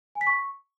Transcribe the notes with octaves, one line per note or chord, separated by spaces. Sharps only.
G#5
B6
C#6